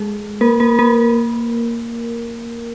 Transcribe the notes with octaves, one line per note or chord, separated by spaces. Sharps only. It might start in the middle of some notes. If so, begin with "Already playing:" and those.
Already playing: G#3 G#4
A#3 A#4
A#3 A#4
A#3 A#4